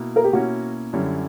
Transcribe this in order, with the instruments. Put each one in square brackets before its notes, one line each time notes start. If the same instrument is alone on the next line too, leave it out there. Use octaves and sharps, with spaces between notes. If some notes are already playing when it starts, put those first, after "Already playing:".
Already playing: [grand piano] B2 A#3 E4
[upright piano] A#4
G4
[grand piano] B2 A#3 C#4 E4 [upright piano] F#4
[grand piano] F#2 D3 G3 C#4 E4